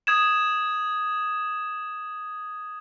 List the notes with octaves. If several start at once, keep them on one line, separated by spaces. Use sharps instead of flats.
D#6 G#6 E7